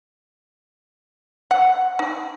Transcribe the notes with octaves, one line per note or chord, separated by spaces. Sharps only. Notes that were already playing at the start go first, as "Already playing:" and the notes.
F#5
D#4